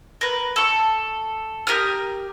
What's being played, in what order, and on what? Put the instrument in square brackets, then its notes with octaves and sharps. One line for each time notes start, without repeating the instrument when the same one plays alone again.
[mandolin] A#4 B4
A4 C#6
G4 A#4 D#6 F6